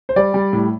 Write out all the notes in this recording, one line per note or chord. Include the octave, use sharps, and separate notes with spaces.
C5
G3 D5
G3
A2